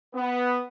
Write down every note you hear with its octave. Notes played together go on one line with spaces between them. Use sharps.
B3